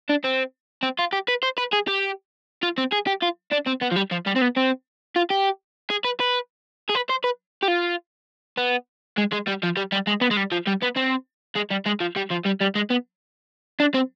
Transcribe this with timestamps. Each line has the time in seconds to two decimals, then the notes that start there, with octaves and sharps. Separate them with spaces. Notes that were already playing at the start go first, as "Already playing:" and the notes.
0.09 D4
0.24 C4
0.83 C4
0.99 F4
1.13 G4
1.28 B4
1.43 C5
1.58 B4
1.73 G#4
1.88 G4
2.63 F4
2.78 C4
2.92 G#4
3.07 G4
3.22 F4
3.51 D4
3.66 C4
3.81 B3
3.91 F3
3.96 G3
4.11 F3
4.26 G3
4.36 C4
4.41 B3
4.56 C4
5.16 F4
5.30 G4
5.90 G#4
6.05 B4
6.20 B4
6.89 G#4
6.95 B4
7.09 C5
7.24 B4
7.63 G4
7.68 F4
8.58 B3
9.17 G#3
9.32 G#3
9.47 G3
9.63 F3
9.77 G3
9.92 G3
10.07 G#3
10.21 B3
10.31 G#3
10.37 G3
10.52 F3
10.67 G3
10.82 B3
10.96 C4
11.56 G#3
11.71 G3
11.86 G#3
12.01 F3
12.16 G3
12.30 F3
12.45 G3
12.61 G3
12.75 G#3
12.90 B3
13.80 D4
13.94 C4